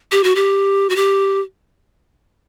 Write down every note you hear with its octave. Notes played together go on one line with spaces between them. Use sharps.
G4
F#4
G4
F#4
G4